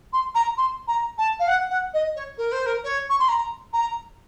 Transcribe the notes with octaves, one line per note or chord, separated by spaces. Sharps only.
C6
A#5
C6
A#5
A5
F5
F#5
F#5
D#5
C#5
A#4
C5
A#4
C#5
C#6
C6
A#5
A#5